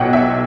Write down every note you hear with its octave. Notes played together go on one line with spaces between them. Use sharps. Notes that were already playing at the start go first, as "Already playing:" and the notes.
Already playing: B1 B2 F#5 G5
E5